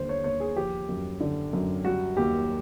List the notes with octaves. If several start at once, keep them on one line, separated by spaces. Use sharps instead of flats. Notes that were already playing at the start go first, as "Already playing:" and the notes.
Already playing: D#2 D3 G3 C5
C#5
D#2 C#5
G#4
F3 G4
F#2
D3
F#2
G3 F#4
D#2 G4